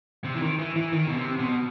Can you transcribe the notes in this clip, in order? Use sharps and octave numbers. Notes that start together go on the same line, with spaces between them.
C3
E3
D#3
E3
E3
D#3
B2
C3
B2